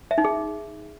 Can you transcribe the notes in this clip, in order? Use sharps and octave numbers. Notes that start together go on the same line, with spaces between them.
E5
D#4
G#4